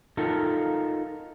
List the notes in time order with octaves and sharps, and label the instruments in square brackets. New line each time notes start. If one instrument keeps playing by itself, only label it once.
[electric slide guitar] D#4 F4 A4 A#4